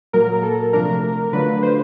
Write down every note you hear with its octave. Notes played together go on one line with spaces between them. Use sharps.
A#2 F#3 A#3 A#4
A4
C3 F3 A3 D4 A#4
D3 F#3 A3 D4 F4 B4
C5